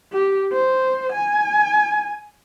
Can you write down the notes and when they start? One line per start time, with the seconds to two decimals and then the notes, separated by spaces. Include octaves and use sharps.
0.12 G4
0.52 C5
1.13 G#5